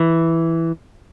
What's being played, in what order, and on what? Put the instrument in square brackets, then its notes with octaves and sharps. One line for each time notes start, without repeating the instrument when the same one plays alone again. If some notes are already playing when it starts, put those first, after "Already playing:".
Already playing: [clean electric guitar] E3